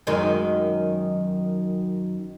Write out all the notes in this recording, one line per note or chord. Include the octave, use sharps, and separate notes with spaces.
F#2 D#3 G#3